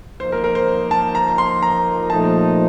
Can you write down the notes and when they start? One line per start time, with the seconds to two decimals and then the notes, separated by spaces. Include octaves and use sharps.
0.20 F3 A#3 D#4 C5
0.32 A#4
0.44 A#4
0.55 C5
0.91 A5
1.15 A#5
1.38 C6
1.62 A#5
2.10 A#2 F3 A3 D#4 A5